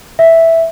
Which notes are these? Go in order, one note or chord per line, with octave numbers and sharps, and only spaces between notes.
E5